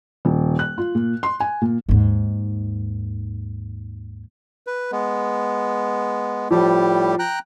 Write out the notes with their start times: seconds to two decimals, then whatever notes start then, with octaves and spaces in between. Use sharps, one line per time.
0.25 D#1
0.59 F#6
0.78 F4
0.95 A#2
1.23 C6
1.40 G#5
1.62 A#2
1.89 D#2 G#2
4.67 B4
4.92 G#3 B3
6.51 A2 F3 G3 G4
7.19 G5 A#5 F#6